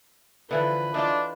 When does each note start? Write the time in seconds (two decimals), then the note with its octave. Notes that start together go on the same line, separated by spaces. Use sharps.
0.51 D3 E3 F3 B4
0.94 E3 D4 D#4 F4